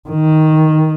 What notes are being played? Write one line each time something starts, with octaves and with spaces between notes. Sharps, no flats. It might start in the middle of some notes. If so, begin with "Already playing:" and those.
D#3